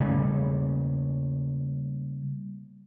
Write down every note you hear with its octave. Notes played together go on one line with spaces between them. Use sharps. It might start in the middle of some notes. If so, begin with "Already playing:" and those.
C#3 G3 A3 A#3